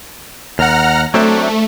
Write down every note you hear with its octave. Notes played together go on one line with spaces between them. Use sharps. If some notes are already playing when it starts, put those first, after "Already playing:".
D#2 F#5 A#5 F6
F#3 A3 C4 D4